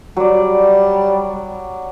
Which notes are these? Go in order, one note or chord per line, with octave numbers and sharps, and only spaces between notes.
F#3 G3 D5